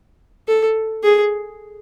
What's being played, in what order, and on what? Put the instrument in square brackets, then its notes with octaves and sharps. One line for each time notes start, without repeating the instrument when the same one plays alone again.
[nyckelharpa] A4
G#4